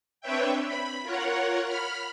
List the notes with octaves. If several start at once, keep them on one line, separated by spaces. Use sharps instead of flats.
C4 D4 B4 C#5 E5 G5
B5
F4 A#4 C#5 F#5
B5 F6